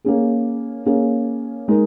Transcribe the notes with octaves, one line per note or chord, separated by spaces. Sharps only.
A#3 C#4 G#4
A#3 C#4 G#4
G#3 D#4 A#4